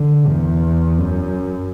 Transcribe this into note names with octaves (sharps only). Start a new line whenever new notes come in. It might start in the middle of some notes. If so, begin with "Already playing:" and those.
Already playing: D3
E2
F#2